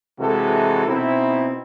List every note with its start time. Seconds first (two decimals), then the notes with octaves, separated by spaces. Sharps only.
0.19 C3 E3 G#3 F#4 A4
0.86 B2 C4 D#4 E4